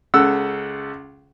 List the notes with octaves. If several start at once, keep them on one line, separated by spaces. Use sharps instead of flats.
C#2 C#3 A4 F#5 E6